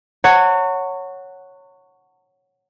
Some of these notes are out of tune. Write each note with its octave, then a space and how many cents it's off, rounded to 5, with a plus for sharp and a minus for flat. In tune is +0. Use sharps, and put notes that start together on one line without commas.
C#5 +0 F#5 +0 A#5 -45